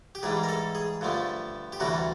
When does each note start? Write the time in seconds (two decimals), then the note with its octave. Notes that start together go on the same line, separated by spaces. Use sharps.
0.15 G4
0.23 G#2 E3 G3 G#4
0.43 A#4
0.49 A4
0.75 G#4
1.01 G2 D3 F3 A3
1.72 G4
1.80 D2 C3 E3 G3 F#4